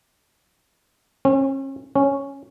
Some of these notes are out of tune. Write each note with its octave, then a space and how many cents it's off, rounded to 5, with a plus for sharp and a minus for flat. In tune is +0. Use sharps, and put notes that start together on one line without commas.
C#4 -40
C#4 -5